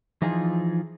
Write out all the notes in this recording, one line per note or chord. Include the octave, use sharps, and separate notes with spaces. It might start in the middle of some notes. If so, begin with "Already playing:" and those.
E3 F3 D#4 F4 G#4